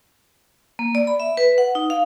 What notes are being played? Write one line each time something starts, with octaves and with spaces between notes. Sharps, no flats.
A#3
D5
B5
E5
B4
F#5
D#4
F5